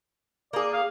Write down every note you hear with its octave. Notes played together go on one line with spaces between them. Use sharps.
A#3 G#4 D5
F5